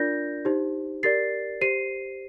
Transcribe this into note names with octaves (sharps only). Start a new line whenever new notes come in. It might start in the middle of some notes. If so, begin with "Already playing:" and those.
Already playing: D4 F4 A#4 D5 G6 A#6
D#4 G4 C5
G4 A#4 D5 A6 C7
G4 C5 C7 D#7